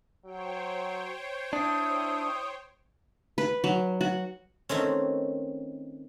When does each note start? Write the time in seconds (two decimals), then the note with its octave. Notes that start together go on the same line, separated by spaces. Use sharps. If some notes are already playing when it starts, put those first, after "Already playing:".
0.25 F#3 C5 C#5 G5
1.53 D4 E4 D#6
3.38 B4
3.64 F#3
4.01 F#4
4.69 D#3 A3 C4 C#4